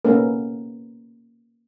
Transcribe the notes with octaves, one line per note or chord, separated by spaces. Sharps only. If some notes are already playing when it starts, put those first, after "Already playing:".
A#3 B3 C#4 A4 A#4